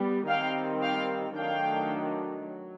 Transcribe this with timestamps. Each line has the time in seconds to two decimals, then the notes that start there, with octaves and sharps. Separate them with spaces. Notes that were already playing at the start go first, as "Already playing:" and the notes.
Already playing: G3 B3
0.28 D#3 G3 C4 F5 G5
0.83 F5 G5
1.37 D#3 F#3 A3 D4 F5 G5
2.47 F#3